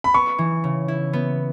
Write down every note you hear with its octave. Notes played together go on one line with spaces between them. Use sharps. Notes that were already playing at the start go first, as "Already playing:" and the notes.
B5
B3 C#6
E3
C#3
E4
B3